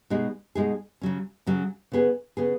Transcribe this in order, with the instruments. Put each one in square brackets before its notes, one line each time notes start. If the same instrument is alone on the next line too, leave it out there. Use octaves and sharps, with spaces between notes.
[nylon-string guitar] B2 G#3 D#4 G#4
B2 G#3 D#4 G#4
C#3 F#3 C#4
C#3 F#3 C#4
C#3 B3 G#4
C#3 B3 G#4